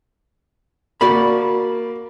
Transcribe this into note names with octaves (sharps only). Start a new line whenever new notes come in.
A#3 F#4 D5 B5